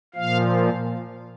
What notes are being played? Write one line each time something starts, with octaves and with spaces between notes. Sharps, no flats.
A#2 F3 F5